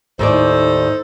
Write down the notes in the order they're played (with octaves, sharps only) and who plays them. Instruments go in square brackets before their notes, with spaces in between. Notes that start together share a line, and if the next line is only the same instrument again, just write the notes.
[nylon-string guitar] D#2 A2 D5 [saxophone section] D#4 A4 C5